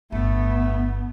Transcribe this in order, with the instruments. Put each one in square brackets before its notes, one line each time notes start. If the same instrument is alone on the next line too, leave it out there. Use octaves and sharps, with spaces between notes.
[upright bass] G1 A2 [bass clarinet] A3 [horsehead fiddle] B3